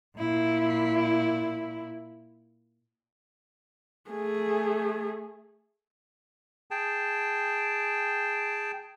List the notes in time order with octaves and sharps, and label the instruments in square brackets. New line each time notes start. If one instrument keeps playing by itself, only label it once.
[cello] A#2 E4
[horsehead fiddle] A3 G#4
[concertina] G#4 G5 A5